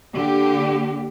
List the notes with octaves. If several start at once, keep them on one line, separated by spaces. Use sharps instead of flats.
D3 A#3 G4